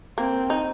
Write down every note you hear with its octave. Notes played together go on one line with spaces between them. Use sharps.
A#3 C4
D#4